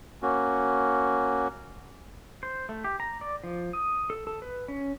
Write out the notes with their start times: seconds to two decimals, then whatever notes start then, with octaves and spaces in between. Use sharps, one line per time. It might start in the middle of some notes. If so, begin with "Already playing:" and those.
0.22 A#3 C#4 F#4
2.43 C5
2.69 A3
2.84 G4
3.00 A#5
3.21 D5
3.44 F3
3.73 D#6
4.10 A4
4.27 A4
4.42 B4
4.68 C#4